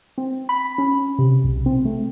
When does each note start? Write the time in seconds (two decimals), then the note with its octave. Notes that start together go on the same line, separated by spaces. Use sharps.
0.18 C4
0.49 B5
0.78 C#4
1.18 C3
1.44 B1
1.66 C4
1.85 A3